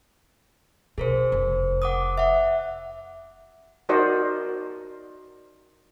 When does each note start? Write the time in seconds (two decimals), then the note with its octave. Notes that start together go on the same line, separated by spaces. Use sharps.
0.98 B2 G#4 A#4 C5
1.32 F1
1.82 F#5 D6 D#6
2.18 E5 F#5
3.89 D#4 F#4 A#4 C5 D5 D#5